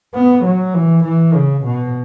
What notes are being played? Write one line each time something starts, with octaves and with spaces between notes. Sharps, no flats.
B3
F#3
E3
E3
C#3
B2